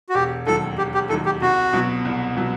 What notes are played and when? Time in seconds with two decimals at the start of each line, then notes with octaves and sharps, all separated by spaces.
0.09 F#4
0.14 E1 G4
0.47 D#2 D#3 F#3 A4
0.78 E1 G4
0.94 G4
1.09 D#2 D#3 F#3 A4
1.26 G4
1.42 C2 F#4
1.73 B2 F#3
2.05 C2
2.37 B2 F#3